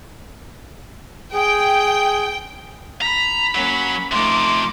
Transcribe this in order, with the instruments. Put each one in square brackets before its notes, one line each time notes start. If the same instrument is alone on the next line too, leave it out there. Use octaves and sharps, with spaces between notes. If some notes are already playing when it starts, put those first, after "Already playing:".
[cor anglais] G#4 [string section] G5
[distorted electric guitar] A#5 [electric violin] B5 B6
[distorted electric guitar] F#3 [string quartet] A#3 C#4
[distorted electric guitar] C3 F3 [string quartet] A3 D#4 [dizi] C6 [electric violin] D6